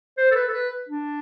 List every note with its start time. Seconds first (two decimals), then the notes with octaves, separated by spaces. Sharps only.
0.18 C5
0.31 A4
0.36 B4
0.48 A4
0.53 B4
0.89 D4